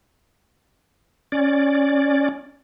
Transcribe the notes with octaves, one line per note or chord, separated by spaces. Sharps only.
C#4 D5